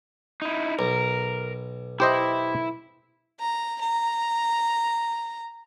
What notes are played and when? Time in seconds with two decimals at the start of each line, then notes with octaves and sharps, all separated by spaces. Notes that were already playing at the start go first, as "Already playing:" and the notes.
0.42 D#4 E4
0.79 B1 A#4
2.00 E4 G4 C5 D#5 E5
3.39 A#5
3.81 A#5